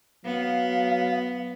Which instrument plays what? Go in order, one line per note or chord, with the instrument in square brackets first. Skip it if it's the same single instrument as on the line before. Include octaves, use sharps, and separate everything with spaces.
[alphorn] F#3 [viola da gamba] B3 [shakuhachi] F5